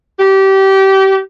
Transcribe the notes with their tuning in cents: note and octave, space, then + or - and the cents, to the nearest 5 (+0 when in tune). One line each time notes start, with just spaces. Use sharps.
G4 -25